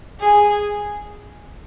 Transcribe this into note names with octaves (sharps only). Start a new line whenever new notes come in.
G#4